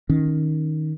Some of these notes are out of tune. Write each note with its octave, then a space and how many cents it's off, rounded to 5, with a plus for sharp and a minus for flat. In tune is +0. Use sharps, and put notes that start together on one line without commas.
D#3 +0 C#4 +0